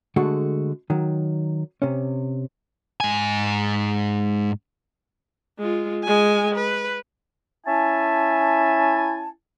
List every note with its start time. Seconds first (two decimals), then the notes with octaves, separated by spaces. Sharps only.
0.16 D3 G#3 A3 F#4
0.90 D#3 F#3
1.82 C3 C#4
3.00 G#2 G#5
5.58 G#3 F4
6.04 G#3 G#5
6.55 B4
7.66 C#4 E4 E5 G#5 A5